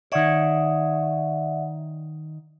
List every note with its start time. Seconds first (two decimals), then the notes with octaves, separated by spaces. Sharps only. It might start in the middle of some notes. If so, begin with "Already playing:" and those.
0.12 D#3 C#5 D5 E5 F#5